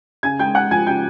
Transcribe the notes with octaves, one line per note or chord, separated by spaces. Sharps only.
C#3 G#5 G#6
G#3 G5 G6
G#3 F#5 F#6
F3 G#5 G#6
C#3 G5 G6